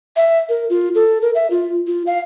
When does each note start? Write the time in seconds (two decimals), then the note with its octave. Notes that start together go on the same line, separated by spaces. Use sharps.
0.17 E5
0.49 A#4
0.70 F4
0.95 A4
1.22 A#4
1.35 E5
1.50 F4
1.87 F4
2.07 F5